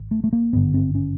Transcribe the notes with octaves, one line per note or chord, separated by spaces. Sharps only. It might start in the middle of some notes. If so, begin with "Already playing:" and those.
Already playing: G#1
A3
A3
A#3
G#1 G2 D3 B3
C4
C#4